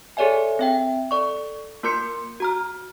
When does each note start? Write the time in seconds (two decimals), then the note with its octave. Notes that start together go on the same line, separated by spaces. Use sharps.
0.17 G#4 A4 C#5 D5 E5 G#5
0.59 C4 E5 G5
1.11 A4 D5 C#6
1.83 A#3 F4 A#4 C6 G6 C#7
2.40 F#4 A#5 F6